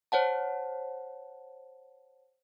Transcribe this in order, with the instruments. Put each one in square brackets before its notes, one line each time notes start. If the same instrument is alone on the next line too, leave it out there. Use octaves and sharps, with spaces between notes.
[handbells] C5 C#5 F#5 A5